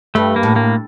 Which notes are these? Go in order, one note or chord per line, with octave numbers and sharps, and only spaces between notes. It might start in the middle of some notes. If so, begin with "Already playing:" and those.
G2 A3
A#3
A2
A#3